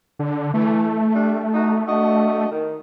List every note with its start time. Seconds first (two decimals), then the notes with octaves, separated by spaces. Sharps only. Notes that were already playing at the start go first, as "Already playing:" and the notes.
0.19 D3
0.54 E3 A3
1.14 G3 D4
1.53 D#4 F#4
1.87 D4 F#4 D#5
2.51 D#3